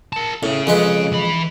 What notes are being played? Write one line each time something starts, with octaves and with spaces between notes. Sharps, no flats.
A#4 A5
A2 C#4 G#4
F2 G#3 B4
E3 B5